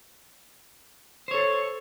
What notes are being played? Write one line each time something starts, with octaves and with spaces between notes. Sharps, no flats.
A4 C5 C#5